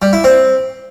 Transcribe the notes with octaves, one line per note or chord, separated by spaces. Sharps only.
G3
E4
C4